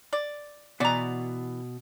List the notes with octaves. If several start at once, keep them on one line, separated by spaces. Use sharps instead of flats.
D5
B2 E3 F#4 G#4 D5 A#5